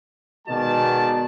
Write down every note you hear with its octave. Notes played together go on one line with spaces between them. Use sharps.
B2 D#3 G#3 F#4 D5 A5